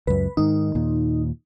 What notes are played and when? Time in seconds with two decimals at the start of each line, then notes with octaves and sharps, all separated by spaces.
0.07 C#2 F#2 B4
0.37 G#2 D#3 D#4
0.75 D#2 A#2